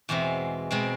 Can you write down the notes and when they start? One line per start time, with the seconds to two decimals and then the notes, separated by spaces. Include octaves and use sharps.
0.09 E2 B2 G#3 C4
0.71 B2 G#3 C4